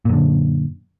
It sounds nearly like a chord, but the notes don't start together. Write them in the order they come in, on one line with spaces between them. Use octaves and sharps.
A#2 F#2 D3